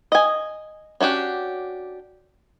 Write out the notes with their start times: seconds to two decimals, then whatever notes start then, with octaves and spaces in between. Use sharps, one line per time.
0.12 D#5 G#5
1.01 C#4 D4 F#4 G4